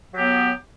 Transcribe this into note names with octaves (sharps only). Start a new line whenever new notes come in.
F#3 B3 G4